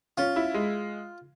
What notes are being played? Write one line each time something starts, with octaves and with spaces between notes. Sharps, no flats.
C#4 F4
E4
G#3